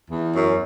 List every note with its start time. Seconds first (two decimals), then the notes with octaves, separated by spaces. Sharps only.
0.11 E2
0.34 F#2